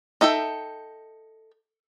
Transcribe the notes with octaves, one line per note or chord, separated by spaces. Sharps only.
D#4 A4 E5 G5